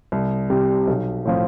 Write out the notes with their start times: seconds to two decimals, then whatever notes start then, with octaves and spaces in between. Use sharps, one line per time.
0.12 C2
0.50 C3 G3
0.88 B1
1.25 A2 F3 C4